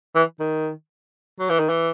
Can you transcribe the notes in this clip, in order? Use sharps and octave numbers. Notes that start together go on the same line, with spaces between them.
E3
D#3
F#3
E3
D#3
E3